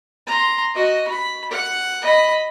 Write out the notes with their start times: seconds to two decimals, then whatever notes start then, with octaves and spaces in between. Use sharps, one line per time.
0.27 A#5 C6
0.75 F#4 D#5
1.08 B5
1.51 F#5
2.02 D#5 B5